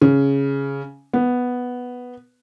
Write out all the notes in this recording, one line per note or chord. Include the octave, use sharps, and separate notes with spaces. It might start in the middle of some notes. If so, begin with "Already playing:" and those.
C#3
B3